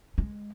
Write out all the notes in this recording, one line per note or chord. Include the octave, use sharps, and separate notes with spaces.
G#3